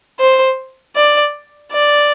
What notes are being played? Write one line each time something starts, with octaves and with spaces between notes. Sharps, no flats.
C5
D5
D5